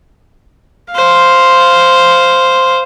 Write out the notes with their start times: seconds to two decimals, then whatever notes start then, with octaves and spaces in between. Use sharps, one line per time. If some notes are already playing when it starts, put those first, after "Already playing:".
0.92 C5 F5